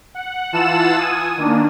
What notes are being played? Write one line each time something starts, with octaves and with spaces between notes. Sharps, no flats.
F#5
E3 F4 F#5 A5 E6 E7
G#5 D#6
D#3 A#3 D4